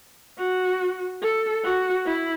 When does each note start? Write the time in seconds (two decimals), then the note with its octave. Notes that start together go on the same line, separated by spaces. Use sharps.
0.38 F#4
1.22 A4
1.64 F#4
2.06 E4